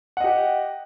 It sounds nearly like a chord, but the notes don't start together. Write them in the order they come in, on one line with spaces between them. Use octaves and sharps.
F#5 D#5 G4